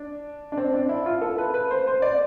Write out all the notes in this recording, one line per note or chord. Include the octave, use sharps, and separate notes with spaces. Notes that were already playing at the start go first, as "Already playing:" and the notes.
Already playing: D4
D4
C4
D4
E4
F4
A4
B4
B4
C5
C5
D5